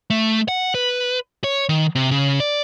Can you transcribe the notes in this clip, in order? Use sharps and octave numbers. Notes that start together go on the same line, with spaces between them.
A3
F#5
B4
C#5
D#3
C3
C#3
D5